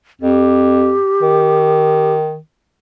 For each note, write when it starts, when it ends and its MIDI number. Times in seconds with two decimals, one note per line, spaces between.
0.21 0.95 41
0.21 2.12 67
1.22 2.37 51